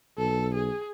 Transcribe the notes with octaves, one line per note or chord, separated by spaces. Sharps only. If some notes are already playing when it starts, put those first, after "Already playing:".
B1 A4
G#4